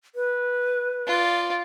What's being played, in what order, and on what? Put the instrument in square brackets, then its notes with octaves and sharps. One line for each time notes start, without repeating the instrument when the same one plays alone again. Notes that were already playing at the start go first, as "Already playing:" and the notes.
[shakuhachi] B4
[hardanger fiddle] F4 D5